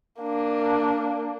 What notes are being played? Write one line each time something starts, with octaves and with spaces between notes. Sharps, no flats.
A#3 D4